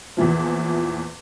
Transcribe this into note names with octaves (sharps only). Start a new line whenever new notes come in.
E2 A#2 E3 F3